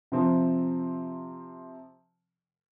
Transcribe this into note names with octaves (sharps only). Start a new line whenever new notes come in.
C3 F3 C4